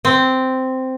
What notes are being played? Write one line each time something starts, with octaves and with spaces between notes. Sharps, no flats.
C4